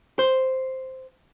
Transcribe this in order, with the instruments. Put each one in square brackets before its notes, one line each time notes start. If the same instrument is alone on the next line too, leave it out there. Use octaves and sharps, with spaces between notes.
[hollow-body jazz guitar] C5